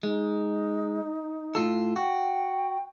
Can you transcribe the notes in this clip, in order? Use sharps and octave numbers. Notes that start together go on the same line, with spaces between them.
G#3 D#4
A2 F4 A4
F#4 G5